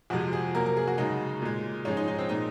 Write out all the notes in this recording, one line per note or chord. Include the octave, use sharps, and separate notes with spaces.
F2 C3 F3 G#3 F#4
G#4
C3 F#3 A#3 A#4
A#4
G#4
F#4
F#2 C#3 G#3 D#4
A#2 G#3
G#2 F3 G#3 C#4
D#4
D#4
C4
A#2 G#3 D#4